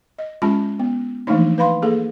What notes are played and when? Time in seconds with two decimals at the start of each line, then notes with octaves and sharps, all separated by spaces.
0.18 D#5
0.42 G#3 C#4 F4 A5 B5
0.80 B3
1.27 E3 F3 A3 A#3 D4 D#4
1.58 B4 F5 B5 C6
1.82 A#3 G#4 A4